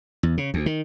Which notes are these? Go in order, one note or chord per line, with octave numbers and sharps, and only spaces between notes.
E2
C#3
D2
D#3